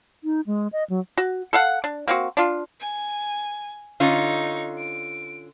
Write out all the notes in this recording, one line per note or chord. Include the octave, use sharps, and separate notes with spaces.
D#4
G#3
D#5
F#3
F#4
A4 F5 F#5
D4
A#3 C4 F#4
D4 F4
G#5
D3 C#4 D#4 F4 C#6
D7